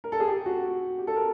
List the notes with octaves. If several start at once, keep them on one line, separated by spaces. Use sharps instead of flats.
A#4
A4
G#4
G4
F#4
G4
A4
A#4